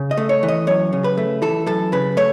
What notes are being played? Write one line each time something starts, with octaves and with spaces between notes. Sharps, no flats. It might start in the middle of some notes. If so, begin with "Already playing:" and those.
Already playing: C#3
D#5
A3
C#5
E3
D#5
F#2 C#5
C#3
B4
A3
E3 A4
F#2 A4
C#3 B4
A3 C#5